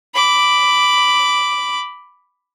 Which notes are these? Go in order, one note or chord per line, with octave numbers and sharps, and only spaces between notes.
B5 D6